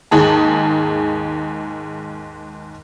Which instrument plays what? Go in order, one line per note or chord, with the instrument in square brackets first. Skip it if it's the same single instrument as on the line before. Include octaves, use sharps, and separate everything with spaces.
[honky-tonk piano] D#2 G#2 G#4 A5